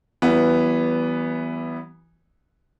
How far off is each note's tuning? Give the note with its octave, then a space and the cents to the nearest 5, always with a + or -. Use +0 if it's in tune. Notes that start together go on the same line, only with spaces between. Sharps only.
E3 +5 G3 -35 B3 +0